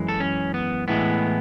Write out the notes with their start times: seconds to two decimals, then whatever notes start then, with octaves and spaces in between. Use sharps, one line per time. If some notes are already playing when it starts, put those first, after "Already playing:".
Already playing: F#2 E3 G#3
0.08 A4
0.20 C#4
0.54 B3
0.88 A2 E3 G#3 B3